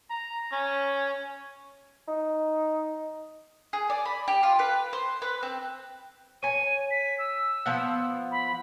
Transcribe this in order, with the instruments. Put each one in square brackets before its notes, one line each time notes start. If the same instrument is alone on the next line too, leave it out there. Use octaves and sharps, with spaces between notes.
[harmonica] A#5
C#4
[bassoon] D#4
[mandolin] G#4
D5
B5
G4
F4
B4
C5
B4
C4
[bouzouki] C#5 G#5 [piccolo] D#7
[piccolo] B6
E6
[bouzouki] F3 B3 F#5
[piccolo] B5